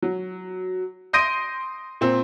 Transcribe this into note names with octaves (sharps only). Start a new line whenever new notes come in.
F#3
C6 D#6 G6 A#6 D7 D#7
A#2 C4